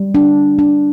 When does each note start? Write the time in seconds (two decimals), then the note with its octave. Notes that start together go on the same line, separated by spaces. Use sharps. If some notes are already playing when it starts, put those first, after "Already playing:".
Already playing: G3
0.15 D4
0.59 D4